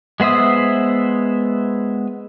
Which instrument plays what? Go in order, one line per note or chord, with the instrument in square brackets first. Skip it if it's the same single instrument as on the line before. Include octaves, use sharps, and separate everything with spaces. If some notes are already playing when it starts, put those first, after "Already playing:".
[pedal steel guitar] G#3 B3 C5 E5 D#6